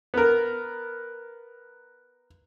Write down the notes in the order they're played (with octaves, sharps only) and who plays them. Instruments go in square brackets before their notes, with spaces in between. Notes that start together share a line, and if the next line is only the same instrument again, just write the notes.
[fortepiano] B3 A#4